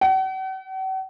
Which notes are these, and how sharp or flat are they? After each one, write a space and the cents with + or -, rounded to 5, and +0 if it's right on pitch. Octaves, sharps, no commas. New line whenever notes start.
F#5 +45